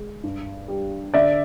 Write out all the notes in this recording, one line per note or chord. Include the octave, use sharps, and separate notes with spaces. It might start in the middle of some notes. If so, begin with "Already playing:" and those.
Already playing: G#3
G2
G3
D3 D5 E5